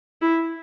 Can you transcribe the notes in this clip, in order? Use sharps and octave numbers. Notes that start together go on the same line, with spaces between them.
E4